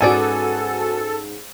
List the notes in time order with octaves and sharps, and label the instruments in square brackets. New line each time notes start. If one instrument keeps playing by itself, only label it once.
[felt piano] G#2 C#4 [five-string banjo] B3 G#4 D5 [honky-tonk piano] F#4 G#5 [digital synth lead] A4